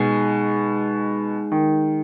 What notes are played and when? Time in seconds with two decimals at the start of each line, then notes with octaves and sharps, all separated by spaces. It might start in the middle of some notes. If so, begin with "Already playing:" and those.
Already playing: B2 G#3 D#4 G#4
1.52 D#3